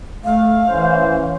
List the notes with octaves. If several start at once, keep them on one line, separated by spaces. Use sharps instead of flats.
A3 F5
E3 C#4 E4 C5